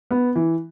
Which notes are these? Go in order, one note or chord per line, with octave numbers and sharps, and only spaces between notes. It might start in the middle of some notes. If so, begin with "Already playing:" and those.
B3
E3